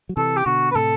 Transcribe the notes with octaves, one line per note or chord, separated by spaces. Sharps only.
F#3
C3 E3 A4
G4
B2 D3 F#4
B4
A2 C3 A4